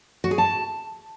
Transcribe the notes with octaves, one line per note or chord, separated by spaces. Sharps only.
F#4
G#4
A5